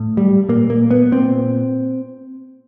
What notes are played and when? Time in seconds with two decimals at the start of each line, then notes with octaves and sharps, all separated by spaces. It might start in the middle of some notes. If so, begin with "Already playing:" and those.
Already playing: A2
0.17 G3
0.49 A#2 A#3
0.70 A#3
0.91 B3
1.12 A#2 C4